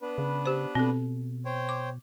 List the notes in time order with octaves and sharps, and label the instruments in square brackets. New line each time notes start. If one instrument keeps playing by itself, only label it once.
[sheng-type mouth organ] B3 D4 B4
[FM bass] C#3
[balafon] G4 C5
[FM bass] B2 [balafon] C4 A4
[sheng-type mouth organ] C5 C#5 G5
[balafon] D6